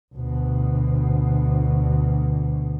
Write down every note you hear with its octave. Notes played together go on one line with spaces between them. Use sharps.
D2 B2